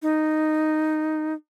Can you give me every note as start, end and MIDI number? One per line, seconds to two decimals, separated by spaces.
0.02 1.33 63